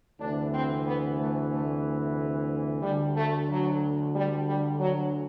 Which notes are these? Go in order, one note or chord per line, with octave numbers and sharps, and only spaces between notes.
D2 C3 E3 D4
C4
B3
A3
A3
D2 D3 G3
A3
F#3
G3
G3
F#3